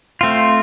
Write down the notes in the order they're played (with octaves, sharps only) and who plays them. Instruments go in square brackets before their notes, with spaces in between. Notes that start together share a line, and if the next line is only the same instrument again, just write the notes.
[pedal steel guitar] A3 C4 F4